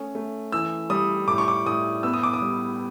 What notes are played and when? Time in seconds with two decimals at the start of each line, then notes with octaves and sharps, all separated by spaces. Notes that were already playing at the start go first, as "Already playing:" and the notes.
Already playing: A3 C#4
0.15 A3
0.52 E3 E6
0.90 G3 D#6
1.28 A2 D6
1.38 C#6
1.48 D6
1.66 A2 D#6
2.03 B3 E6
2.14 D#6
2.23 D6
2.33 D#6
2.41 G3